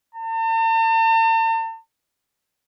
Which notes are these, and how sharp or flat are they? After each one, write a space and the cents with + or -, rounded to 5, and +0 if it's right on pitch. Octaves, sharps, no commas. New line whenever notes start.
A5 +45